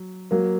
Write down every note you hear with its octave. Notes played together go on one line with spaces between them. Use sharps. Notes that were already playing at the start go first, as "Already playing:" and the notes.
Already playing: F#3
F#3 A#3